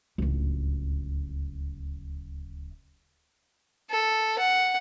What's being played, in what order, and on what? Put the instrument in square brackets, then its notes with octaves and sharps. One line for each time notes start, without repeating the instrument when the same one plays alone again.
[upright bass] D1 C#2
[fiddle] A4
F#5